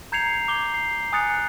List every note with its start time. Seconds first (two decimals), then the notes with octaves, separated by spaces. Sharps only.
0.12 A#5 G6 G#6 C7 C#7 F7
0.48 D6 G6 G7
0.74 C7
1.13 G#5 D#6 F#6 A6 C#7 F7